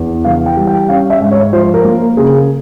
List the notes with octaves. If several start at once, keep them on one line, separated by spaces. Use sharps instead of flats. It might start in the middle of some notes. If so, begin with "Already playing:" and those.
Already playing: E2
E3 F5
G5
G3
G5
C#4 F5
E5
G#2
C#5
F3 C5
A#4
A#3
C#3 G#4